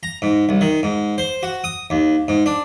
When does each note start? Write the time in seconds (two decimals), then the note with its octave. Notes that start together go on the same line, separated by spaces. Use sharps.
0.03 A#5
0.22 G#2
0.49 C2
0.61 D#3
0.83 G#2
1.18 C5
1.43 F#4
1.64 D#6
1.90 D#2
2.28 G#2
2.46 D4